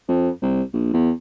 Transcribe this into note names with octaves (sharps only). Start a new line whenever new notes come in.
F2
C2
A#1
E2